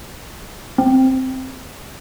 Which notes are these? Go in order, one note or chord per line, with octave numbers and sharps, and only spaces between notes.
C4